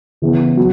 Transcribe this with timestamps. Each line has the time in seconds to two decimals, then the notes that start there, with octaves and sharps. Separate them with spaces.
0.22 C#3 E3 B3 E4
0.57 F#3